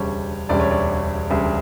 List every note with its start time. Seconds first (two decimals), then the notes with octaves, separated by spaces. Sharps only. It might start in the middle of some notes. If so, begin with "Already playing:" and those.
Already playing: E1 D2 C#3 G3 C#5
0.49 E1 D2 C#3 G3 D5
0.60 C#5
0.71 D5
1.30 E1 D2 C#3 G3